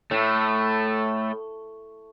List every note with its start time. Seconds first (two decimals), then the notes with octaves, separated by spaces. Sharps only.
0.11 A2 A3